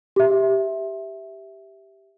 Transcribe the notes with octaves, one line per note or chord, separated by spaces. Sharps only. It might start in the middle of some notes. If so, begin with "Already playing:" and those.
G4 E5